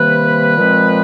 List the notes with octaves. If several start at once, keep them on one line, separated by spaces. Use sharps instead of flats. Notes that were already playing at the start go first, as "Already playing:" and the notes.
Already playing: C3 D#3 G3 A#3 B4
A#2 F3 G#3 C4